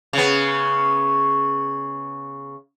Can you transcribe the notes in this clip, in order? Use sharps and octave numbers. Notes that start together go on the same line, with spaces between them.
C#3 B3